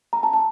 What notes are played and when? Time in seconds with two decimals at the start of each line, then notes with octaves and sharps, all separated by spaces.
0.13 A#5
0.23 A5
0.33 A5